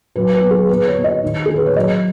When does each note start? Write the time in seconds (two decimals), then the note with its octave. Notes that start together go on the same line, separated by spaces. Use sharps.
0.16 F#3 B4
0.34 B4
0.42 B3
0.51 G#4
0.69 B3 B4
0.87 C#5
0.96 B3
1.04 D#5
1.23 D#3
1.46 D#3 G#4
1.56 B4
1.66 C#5
1.76 F#3 D#5